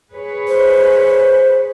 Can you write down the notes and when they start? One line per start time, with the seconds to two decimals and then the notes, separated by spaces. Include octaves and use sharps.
0.12 G#4 B4 C#5
0.48 C5